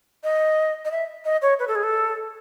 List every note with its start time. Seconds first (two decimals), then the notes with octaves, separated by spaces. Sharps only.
0.24 D#5
0.85 D#5
0.92 E5
1.25 D#5
1.42 C#5
1.59 B4
1.68 A4
1.75 G#4
1.83 A4